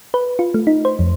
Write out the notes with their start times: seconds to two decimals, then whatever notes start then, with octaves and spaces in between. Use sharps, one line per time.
0.14 B4
0.39 F4
0.54 A3
0.67 D#4
0.85 C5
0.99 F2